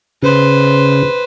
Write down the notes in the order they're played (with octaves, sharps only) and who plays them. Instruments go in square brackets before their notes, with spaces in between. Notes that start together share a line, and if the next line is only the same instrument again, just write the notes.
[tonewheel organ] C#3 [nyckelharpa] B4 C5